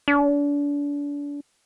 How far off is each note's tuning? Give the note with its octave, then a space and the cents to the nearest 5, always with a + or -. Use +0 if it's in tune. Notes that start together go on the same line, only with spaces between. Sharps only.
D4 -35